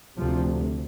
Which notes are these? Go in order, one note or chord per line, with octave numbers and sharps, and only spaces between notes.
D2 C3 F3